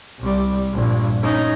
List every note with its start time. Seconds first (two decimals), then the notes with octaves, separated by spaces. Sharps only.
0.20 C2 G3
0.73 A#1 G2
1.22 C#4 D#4